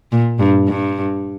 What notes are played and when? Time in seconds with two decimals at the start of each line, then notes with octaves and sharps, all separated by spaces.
0.12 A#2
0.39 G2
0.68 G2